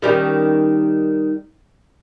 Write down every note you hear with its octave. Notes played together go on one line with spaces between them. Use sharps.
D#3 G3 C#4